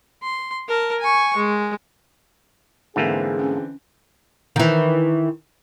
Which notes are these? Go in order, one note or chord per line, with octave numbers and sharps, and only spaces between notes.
C6
A#4 A5
G#5 C#6
G#3
G#2 D3 E3 A3 A#3 C4 G#4
C#4
D#3 E3